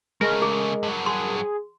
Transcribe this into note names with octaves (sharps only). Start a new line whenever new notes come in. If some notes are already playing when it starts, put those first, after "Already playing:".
C#3 G#3 A3 A#4
G#4
G2 F#3
G#4 C6